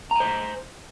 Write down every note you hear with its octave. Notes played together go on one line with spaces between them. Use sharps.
C5 G#5 A#5